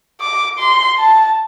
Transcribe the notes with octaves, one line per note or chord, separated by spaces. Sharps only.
D6
C6
A5